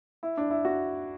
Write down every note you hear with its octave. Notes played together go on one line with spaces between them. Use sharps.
E4
D4
E4
F#4